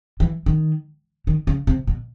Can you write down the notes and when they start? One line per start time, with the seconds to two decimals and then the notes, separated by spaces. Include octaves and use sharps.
0.20 E3
0.46 D#3
1.27 D#3
1.47 C#3
1.67 C3
1.87 B2